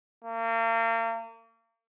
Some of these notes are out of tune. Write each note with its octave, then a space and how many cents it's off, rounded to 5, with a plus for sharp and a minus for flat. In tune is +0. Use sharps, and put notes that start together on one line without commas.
A#3 -35